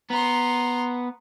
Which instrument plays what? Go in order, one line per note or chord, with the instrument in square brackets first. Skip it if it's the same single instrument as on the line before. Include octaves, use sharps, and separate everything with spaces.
[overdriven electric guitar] B3 [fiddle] A#5 C6